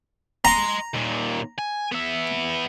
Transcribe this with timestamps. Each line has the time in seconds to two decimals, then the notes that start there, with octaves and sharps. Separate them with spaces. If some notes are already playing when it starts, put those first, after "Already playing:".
0.45 D#5 A#5 C6
0.95 D#2 A#2
1.59 G#5
1.92 B3 E5